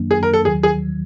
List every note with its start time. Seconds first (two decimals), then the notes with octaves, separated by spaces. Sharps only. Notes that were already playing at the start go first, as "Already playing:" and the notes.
Already playing: F#2 D#3 F#3 A#3 D4
0.11 G#4
0.23 A#4
0.34 A4
0.45 D#2 D#3 F#3 G#4
0.63 G#4